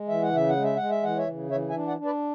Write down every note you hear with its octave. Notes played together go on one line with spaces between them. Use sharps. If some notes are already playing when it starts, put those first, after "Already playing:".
Already playing: G#3
E3 E5
F#5
C#3 E5
F#5
G#3
E5
G#3 F#5
E5
E3 F#5
C#5 E5
C#3
E3 C#5 E5
E5 G#5
D4
D5 F#5
D4
B4 D5